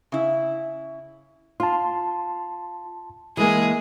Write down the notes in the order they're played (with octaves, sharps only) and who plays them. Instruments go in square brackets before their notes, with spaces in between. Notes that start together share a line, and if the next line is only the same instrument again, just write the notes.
[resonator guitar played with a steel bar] C#3 E4
[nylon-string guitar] F4 [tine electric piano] A5 C6
[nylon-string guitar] E3 G#3 A#3 [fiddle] G#4